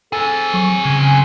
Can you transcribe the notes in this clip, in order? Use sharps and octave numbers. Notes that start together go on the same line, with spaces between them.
C4 G#4 A4
F#3 C#6
C#3 G#5